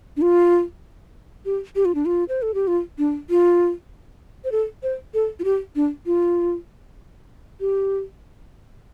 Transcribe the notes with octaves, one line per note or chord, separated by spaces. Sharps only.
D4
F4
G4
G4
F4
D4
F4
C5
A4
G4
F4
D4
F4
C5
A4
C5
A4
F4
G4
D4
F4
G4